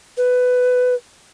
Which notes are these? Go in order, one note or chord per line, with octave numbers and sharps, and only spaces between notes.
B4